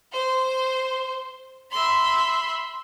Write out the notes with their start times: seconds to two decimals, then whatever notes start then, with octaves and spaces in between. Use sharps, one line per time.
0.11 C5
1.70 E5 B5 C6